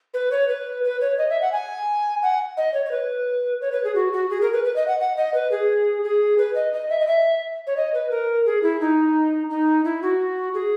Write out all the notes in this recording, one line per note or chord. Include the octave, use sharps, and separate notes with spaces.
B4
C#5
B4
B4
C#5
D#5
E5
F#5
G#5
F#5
D#5
C#5
C#5
B4
C#5
B4
G#4
F#4
F#4
G#4
A#4
B4
B4
D#5
F#5
F#5
D#5
B4
G#4
G#4
B4
D#5
D#5
E5
D#5
E5
C#5
D#5
B4
A#4
G#4
E4
D#4
D#4
E4
F#4
G#4